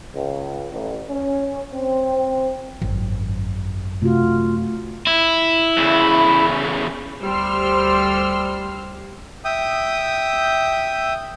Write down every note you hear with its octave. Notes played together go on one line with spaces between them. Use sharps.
C#2
A1
C#4
C4
G#1 F#2 F#3
C3 A3 F4 F#4
E4
E2 C#3
D2 G3 C5 C6 E6 F6
E5 G5 D#6